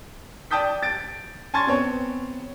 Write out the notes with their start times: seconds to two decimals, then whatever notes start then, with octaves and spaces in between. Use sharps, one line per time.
0.51 D5 G5 A5 D#6 G6 B6
0.83 A6 D7
1.54 G#5 A5 C6 C#6 G#6 A6
1.67 B3 C4 C#5